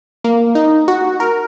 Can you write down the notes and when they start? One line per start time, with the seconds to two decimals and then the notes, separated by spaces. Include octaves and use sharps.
0.24 A#3
0.55 D#4
0.88 F#4
1.20 A#4